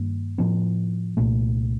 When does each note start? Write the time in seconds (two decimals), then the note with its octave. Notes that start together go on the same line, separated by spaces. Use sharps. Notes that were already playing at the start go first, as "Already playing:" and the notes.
Already playing: G2 D#3 A#3
0.38 A2 F3 C4
1.17 C2 A#2 A3